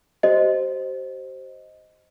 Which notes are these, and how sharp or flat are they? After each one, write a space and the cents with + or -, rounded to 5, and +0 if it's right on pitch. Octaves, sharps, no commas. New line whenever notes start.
G4 -45 C5 +0 D#5 +0